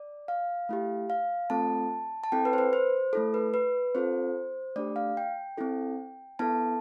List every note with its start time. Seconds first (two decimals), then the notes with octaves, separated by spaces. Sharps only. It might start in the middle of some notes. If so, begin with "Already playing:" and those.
Already playing: D5
0.28 F5
0.69 A3 E4 G4
1.10 F5
1.50 A3 C4 F4 A4 A5
2.24 A5
2.32 C4 E4 A4 G5
2.45 B4
2.53 C5
2.58 B4
2.73 C5
3.13 A3 E4 A4
3.34 B4
3.54 B4
3.95 C4 F4 A4 C5
4.76 A3 D4 G4 D5
4.96 F5
5.17 G5
5.58 C4 E4 A4
6.39 B3 E4 A4 A5